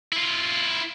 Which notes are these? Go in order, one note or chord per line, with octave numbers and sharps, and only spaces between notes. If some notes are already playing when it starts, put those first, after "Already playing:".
E4 F4